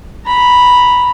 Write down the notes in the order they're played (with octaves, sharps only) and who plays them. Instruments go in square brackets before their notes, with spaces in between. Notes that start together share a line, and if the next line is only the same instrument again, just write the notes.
[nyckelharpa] A#5 B5